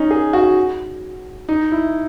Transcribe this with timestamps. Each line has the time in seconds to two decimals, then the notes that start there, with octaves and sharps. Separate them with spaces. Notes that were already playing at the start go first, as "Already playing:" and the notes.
Already playing: C#4 D#4
0.11 G#4
0.33 F#4
1.49 D#4
1.72 E4